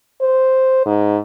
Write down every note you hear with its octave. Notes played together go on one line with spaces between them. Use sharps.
C5
G#2